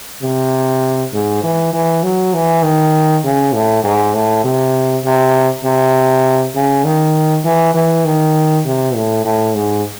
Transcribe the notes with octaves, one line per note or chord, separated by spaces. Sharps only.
C3
G#2
E3
E3
F#3
E3
D#3
C#3
A2
G#2
A2
C3
C3
C3
C#3
D#3
E3
E3
D#3
C3
A2
A2
G#2